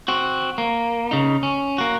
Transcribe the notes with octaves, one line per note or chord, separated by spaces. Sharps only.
C4 F#4
A#3
C#3 D#4
C#4
A#3 F#4